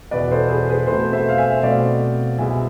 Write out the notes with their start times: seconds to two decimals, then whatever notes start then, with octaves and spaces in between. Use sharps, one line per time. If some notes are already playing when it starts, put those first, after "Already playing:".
0.11 E2 B2 B3 B4 D5
0.31 A4 C5
0.50 G#4 B4
0.69 G#4 B4
0.87 B2 A3 C4 A4 C5
1.13 C5 E5
1.28 F5
1.38 E5 G#5
1.63 B2 A3 C4 D5 F5
2.38 C2 B2 G#3 E5 G#5